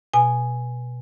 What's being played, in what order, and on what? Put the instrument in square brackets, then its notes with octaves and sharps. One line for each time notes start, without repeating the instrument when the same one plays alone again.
[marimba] B2 G#5